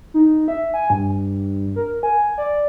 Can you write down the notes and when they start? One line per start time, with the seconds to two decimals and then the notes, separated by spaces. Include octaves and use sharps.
0.14 D#4
0.48 E5
0.74 G#5
0.90 G2
1.76 A#4
2.03 G#5
2.38 D5